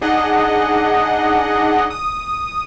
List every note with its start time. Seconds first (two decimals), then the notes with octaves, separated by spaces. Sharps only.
0.01 D4 D#4 G#4 D#5 F#5
1.90 D#6